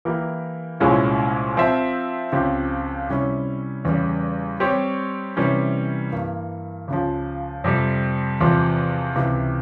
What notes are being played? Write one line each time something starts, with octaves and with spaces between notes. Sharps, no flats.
E3 A#3 E4 G4 A#4
C2 A#2 G#3 C#4 E4
F3 C4 F4 C5 E5
C#2 C#3 F3 C4 G4
C3 G3 C#4 E4
E2 C#3 G3
G3 C4 G4 C#5
C3 E3 G3 C#4
G2 E3 A#3
C#2 C#3 F3
F2 C3 G3
E2 C3 F3
C#2 C3 E3